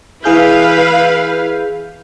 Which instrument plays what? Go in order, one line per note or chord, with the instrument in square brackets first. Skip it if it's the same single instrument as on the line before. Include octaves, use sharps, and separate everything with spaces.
[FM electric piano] E3 G#4 G6 [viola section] E4 B4 F5